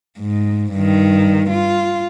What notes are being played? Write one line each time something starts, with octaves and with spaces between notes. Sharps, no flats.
G#2
G2 D#3
F4